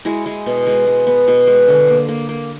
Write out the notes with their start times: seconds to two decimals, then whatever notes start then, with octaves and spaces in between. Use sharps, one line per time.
0.05 G#3 E4 F#4
0.26 G#3
0.46 B2
0.67 G#3
0.87 G#3
1.07 B3
1.28 B2
1.47 G#3
1.68 D3
1.88 A#3
2.09 A#3
2.29 A#3